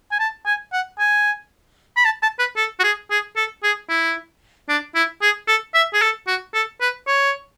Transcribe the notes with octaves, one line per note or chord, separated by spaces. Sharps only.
G#5
A5
G#5
F#5
G#5
B5
A5
A5
B4
A4
F#4
G#4
G#4
A4
G#4
E4
D4
E4
G#4
A4
E5
G#4
A4
F#4
A4
B4
C#5